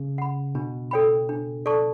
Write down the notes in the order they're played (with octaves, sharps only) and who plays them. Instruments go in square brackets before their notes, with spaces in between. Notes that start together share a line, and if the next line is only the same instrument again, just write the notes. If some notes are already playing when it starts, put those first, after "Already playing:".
Already playing: [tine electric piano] C#3
[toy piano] F#5 B5
[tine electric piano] B2 [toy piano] D4
[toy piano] A4 C#5 G5 B5
D4
A4 D5 A5 C#6